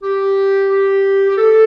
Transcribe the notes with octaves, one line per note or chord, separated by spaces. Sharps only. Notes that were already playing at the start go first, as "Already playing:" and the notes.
G4
G4
G4
A4